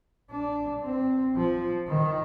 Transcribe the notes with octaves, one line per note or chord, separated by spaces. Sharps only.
D4
C4
F3
D#3